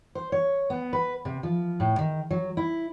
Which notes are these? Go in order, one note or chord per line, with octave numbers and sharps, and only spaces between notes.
C5
C#5
B3
B4
C3
F3
A2
D#3
F#3
E4